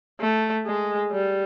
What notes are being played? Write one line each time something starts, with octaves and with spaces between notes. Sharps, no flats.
A3
G#3
G3